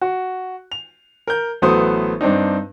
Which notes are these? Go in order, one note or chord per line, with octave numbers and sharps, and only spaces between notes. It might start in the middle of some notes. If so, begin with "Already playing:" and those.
F#4
F7
A#4 G6
A1 F#3 A3 B3 C5 D#6
G2 C4 D4 D#4